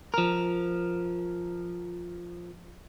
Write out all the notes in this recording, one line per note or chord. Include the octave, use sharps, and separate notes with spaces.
F3 A#4